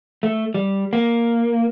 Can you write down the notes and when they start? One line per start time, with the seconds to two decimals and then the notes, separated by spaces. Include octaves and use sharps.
0.23 A3
0.54 G3
0.93 A#3